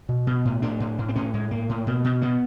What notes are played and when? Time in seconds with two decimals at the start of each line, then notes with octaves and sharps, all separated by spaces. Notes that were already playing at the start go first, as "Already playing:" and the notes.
0.09 B2
0.27 B2
0.45 A2
0.62 A2 D4
0.80 A2
0.98 A2
1.09 C4
1.16 A2 C#4
1.34 A2 G#3
1.51 A2 A#3
1.69 A2
1.87 B2
2.04 B2
2.22 B2 B3